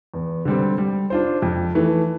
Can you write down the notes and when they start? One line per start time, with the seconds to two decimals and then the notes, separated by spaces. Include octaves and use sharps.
0.14 E2
0.45 D3 G3 C4
0.78 G3
1.10 D4 F4 C5
1.42 F2
1.75 E3 A3